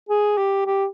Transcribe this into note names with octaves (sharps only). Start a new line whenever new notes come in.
G#4
G4
G4